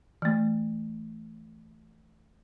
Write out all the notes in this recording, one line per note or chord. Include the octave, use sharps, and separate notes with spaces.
E3 A3